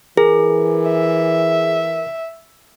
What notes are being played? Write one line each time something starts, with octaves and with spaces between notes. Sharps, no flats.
E3 G#4 A#4
E5